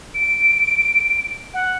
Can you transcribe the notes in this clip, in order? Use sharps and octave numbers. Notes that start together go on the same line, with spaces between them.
D7
F#5